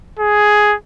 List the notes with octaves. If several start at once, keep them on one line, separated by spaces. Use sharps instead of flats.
G#4